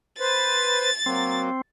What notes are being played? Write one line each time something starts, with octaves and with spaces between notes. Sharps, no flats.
B4 C5 A6
F#3 A#3 C4